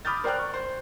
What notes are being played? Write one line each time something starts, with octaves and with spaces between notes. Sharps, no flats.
B5 D6 D#6 F6 G6 A6
A#4 C5 D5 G5 F6 F#6
C#6
C5